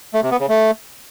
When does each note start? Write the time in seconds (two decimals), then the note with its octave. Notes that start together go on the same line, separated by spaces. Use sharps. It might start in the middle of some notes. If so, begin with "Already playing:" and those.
0.14 A3
0.23 C3
0.31 B3
0.40 C#3
0.49 A3